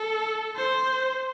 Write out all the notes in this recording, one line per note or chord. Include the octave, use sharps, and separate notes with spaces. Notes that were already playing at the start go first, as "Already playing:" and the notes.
Already playing: A4
C5